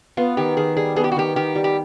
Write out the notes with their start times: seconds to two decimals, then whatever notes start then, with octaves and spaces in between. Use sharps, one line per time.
0.17 B3 F4
0.37 D#3 G4
0.57 D#3 G#4
0.77 G3 G#4
0.96 B3 G#4
1.04 G4
1.12 F#4
1.17 D#3 G4
1.36 D#3 G4
1.56 G3
1.64 G4